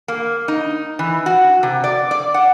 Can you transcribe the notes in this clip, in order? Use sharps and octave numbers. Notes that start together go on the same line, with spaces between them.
A#3
D#4
E3
F#4
C3
D5
D5
F#5